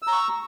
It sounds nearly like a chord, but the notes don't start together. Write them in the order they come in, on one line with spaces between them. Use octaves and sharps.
E6 A#5 C#6